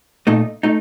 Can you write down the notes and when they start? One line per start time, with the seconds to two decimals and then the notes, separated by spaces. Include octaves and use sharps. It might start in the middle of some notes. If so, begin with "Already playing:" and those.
0.27 A#2 A3 D#4
0.63 A3 D#4